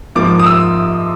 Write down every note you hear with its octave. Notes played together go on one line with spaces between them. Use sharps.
G#2 F3 A#3 D6
D#6
E6